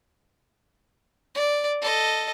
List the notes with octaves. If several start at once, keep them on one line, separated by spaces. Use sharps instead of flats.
D5
A4 D#5